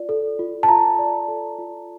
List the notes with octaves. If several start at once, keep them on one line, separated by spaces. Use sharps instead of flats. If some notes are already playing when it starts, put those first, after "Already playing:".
Already playing: F4 D5
A4
F4
A5
F4 A#5
D5
A4
F4